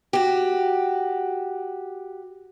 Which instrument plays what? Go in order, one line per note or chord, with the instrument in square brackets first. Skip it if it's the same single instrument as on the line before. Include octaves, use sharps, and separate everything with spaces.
[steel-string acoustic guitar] F#4 G4